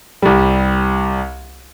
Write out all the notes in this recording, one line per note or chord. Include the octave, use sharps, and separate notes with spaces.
C2 G3